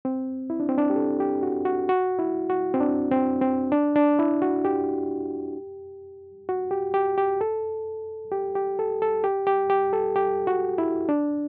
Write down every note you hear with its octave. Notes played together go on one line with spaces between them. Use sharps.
C4
E4
D4
C4
D4
G4
A4
G4
F#4
F#4
F#4
E4
F#4
C4
D4
C4
C4
D4
D4
E4
F#4
G4
F#4
G4
G4
G4
A4
G4
G4
A4
A4
G4
G4
G4
A4
G4
F#4
E4
D4